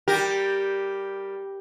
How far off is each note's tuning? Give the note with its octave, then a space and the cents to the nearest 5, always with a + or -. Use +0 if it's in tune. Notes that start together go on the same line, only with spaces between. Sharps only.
G3 +0 G4 +0 A#4 +0